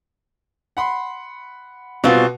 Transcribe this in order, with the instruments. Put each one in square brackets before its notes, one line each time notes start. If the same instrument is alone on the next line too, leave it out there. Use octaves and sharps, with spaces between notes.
[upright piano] F#5 B5 C6
[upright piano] B2 B3 F#4 [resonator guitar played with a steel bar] G3 C4 F4